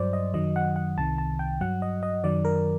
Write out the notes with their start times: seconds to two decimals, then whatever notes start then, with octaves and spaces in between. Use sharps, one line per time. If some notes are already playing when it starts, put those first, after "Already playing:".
Already playing: G2 F#3 C5 D5
0.13 D#5
0.34 F#2 D#3 F#3 D#5
0.56 F#5
0.76 F#5
0.98 C2 C3 D#3 A5
1.18 A5
1.39 G5
1.60 G2 F#3 F#5
1.82 D#5
2.03 D#5
2.23 F#2 D#3 F#3 D5
2.45 A#4